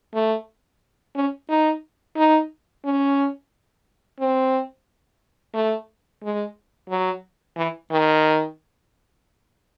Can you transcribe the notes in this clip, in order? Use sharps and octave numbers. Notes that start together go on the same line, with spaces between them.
A3
C#4
D#4
D#4
C#4
C4
A3
G#3
F#3
E3
D#3